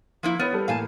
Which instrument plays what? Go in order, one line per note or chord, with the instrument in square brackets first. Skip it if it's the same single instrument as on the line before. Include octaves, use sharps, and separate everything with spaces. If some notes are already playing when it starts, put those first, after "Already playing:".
[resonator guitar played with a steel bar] F3 A#3 E4
[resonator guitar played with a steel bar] B3 [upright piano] B4 C#5 F6
[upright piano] G3 A4 B4
[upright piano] A2 E3 A#3 [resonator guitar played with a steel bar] F5 G#5 A5